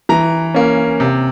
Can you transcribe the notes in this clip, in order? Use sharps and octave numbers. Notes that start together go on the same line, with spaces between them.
E3 A#5
A#3 C#4
C3